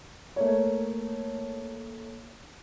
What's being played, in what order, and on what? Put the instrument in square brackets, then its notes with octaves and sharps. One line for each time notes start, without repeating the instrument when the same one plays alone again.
[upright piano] A3 A#3 C#5